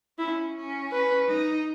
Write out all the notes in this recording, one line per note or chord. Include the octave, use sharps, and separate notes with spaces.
C#4 E4
C#4
B4
D#4